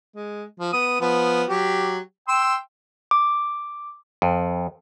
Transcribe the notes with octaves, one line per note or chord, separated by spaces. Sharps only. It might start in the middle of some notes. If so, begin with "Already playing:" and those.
G#3
F3
B3 D#6
F3 B3
F#3 G4
G5 C6 E6
D6
F2